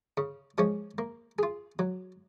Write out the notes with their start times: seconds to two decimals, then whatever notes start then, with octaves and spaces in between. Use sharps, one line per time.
0.17 C#3
0.58 F3 G#3 C#4
0.98 A#3
1.39 F4 G#4
1.79 F#3